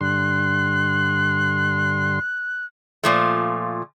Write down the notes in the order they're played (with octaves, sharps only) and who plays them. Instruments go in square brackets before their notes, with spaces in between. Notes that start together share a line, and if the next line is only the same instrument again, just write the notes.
[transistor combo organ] G2 D3 C6 [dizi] F#6
[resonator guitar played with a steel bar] A#2 F3 A3